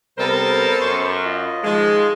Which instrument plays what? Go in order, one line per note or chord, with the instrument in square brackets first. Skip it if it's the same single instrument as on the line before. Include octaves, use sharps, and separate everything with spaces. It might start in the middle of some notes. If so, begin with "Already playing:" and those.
[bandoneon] C3 G3 [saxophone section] B3 A4 C5 [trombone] A#4
[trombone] F#2 [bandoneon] C6 C#6
[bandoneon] F4 D#5
[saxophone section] D#3 G#3 [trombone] F3